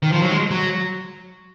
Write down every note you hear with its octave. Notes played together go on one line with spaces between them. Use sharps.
D#3
F3
F#3
G#3
F#3